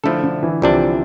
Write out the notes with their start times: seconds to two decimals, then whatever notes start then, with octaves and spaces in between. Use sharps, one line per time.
0.04 D3 F3 A3 E4 A4
0.23 D3
0.43 E3
0.61 C2 C3 F3 G3 D4